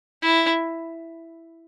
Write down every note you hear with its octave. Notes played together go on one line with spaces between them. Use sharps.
E4